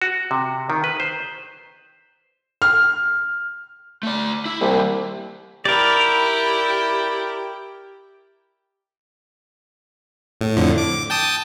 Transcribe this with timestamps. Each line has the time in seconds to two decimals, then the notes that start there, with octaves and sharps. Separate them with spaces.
0.02 F#4
0.31 C3
0.70 D#3
0.84 B4
1.00 C5
2.62 F6
4.03 A3 D5
4.45 E4
4.61 C2 G3 A#3
5.65 E4 G4 A#4 D5
10.41 A2
10.56 F2 A2 D3
10.78 D6
11.10 G5 A5 D#6